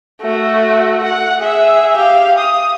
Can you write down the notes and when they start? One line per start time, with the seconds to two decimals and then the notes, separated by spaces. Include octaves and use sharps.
0.21 A3 F#4
1.03 F#5
1.40 G#4 E5
1.96 G4 F5
2.38 D#6